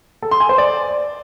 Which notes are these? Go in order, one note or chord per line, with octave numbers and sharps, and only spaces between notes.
A4
C6
G#5
C5
D5